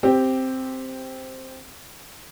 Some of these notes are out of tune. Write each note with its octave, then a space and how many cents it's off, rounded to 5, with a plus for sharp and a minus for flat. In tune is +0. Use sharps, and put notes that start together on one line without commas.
C4 +0 G4 +0